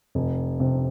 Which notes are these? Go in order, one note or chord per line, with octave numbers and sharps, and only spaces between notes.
F1
C3